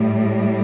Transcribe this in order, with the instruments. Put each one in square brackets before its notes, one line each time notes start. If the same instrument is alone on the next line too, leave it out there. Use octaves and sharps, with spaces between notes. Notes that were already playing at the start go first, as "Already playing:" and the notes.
Already playing: [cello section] A2 G3